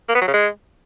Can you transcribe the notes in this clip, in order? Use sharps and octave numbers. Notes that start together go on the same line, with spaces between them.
A#3
B3
F#3
C#3
G#3